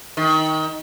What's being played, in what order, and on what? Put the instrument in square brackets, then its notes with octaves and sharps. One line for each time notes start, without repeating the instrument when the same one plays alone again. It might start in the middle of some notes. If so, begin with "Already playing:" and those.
[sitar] D#3